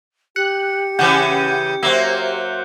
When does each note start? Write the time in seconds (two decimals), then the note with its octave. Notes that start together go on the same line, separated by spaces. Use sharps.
0.36 G4 F#6 C#7
0.99 C#3 E3 C#4 F#5 G6
1.83 F#3 A#3 C5 E5